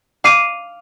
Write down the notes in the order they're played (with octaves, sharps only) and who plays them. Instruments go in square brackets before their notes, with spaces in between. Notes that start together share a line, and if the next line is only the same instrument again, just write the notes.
[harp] F5 D6 C7 D#7